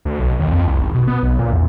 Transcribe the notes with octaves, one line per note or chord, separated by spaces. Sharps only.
D2
B1
D#2
F2
C2
G#1
B2
B3
B1
A#2
E2